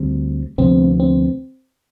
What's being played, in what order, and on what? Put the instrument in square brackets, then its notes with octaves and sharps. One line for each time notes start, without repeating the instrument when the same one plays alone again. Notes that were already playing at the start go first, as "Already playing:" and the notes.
Already playing: [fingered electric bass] D2 D3 G3 C4
[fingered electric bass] D2 C3 F3 B3 [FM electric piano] C4
[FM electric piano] C4